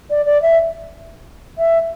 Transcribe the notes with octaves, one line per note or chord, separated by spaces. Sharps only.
D5
D5
E5
E5